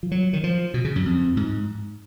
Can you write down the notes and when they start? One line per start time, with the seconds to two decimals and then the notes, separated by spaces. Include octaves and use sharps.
0.03 F3
0.11 F#3
0.33 D#3
0.44 F3
0.74 B2
0.85 C#3
0.96 F#2
1.06 F2
1.37 G#2